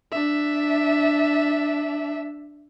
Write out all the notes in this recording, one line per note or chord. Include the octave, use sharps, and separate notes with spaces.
D4 E5